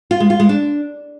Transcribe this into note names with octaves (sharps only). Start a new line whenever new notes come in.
F4
G#3
F4
G#3
D4